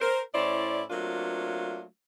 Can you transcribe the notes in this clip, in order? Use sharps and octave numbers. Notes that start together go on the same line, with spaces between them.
A#4 C5
A2 C#4 E4 C5 D5
F#3 A3 A#3 C4 D4 F4